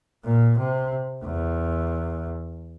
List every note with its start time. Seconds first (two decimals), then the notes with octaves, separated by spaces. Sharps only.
0.25 A#2
0.58 C3
1.24 E2